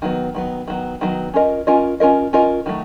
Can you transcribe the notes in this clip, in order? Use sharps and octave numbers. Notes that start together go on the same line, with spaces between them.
D#3 F#3 B3
D#3 F#3 B3
D#3 F#3 B3
D#3 F#3 B3
C#4 F4 A#4 D#5
C#4 F4 A#4 D#5
C#4 F4 A#4 D#5
C#4 F4 A#4 D#5
D#3 F#3 A3